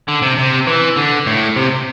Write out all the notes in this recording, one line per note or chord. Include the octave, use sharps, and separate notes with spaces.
D3
C3
C3
E3
D3
A2
C3